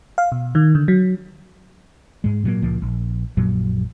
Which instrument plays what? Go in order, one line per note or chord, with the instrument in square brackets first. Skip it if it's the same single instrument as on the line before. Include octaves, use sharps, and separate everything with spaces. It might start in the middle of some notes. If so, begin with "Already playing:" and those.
[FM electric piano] F5
B2
D#3
D3
F#3
[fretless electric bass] G#2 G#3
A#2 F#3 G3 A#3
C#2 A#2 F3 A#3
A#1
A#1 F#2 A#2 F#3